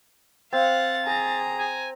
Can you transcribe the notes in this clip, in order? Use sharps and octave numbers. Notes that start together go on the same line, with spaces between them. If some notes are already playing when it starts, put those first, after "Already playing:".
C4 F5 F#5 A6
G#4 A#5
G#5